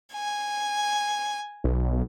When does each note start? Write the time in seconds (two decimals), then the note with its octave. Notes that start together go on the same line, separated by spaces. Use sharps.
0.12 G#5
1.64 B1